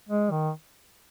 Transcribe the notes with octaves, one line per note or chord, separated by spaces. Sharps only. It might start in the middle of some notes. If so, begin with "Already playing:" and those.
G#3
D#3